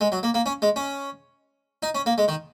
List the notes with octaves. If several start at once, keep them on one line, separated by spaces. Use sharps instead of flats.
G#3
F#3
A#3
A#3
C#4
G#3
C#4
D#4
C#4
A#3
G#3
D#3